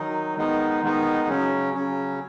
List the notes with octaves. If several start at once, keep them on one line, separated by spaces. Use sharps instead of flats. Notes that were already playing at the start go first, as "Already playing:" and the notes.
Already playing: D#3 F#3 D#4
D#3 G#3 B3 D#4
D#3 G#3 B3 D#4
C#3 F#3 C#4
C#3 F#3 C#4